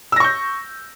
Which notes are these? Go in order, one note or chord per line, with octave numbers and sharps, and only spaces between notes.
C#6 E6 G6 A#6